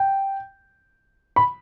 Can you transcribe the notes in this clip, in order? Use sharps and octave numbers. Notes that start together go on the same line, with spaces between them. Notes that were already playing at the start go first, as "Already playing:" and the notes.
Already playing: G5
B5